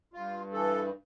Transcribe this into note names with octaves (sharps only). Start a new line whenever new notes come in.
G2 F4
E3 A4